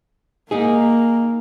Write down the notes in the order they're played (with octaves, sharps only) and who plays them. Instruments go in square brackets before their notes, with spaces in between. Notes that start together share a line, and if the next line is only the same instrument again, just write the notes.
[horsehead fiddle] A#3 [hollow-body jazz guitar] D#4 G#4